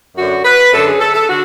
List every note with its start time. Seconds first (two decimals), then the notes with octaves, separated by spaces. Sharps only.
0.16 F#2 D3 F#4
0.45 B4
0.72 F#2 D3 A4
0.87 G#4
1.00 A4
1.14 A4
1.29 D3 F#4